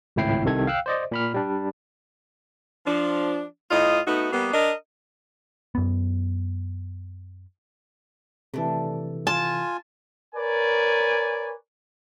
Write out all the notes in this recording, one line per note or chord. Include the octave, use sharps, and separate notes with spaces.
G#1 C#2 A2 E4 G5 C7
C2 C3 D#3 A4 G#6
F5 G5 E6 F#6
C5 D5 D#5
A#2 B5 F6
G3 D4
F3 D4
A2 F4 D#5
A3 B3 D#4 F#4
G3 A#3 B3
D4 A#4 D#5
F#2 B3
C3 E3 A3 D4
F4 G#5 A5
A#4 B4 C#5 D5 G#5